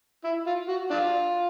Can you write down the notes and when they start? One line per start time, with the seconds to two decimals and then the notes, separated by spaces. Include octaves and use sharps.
0.24 E4
0.46 F4
0.68 F#4
0.90 D4 F4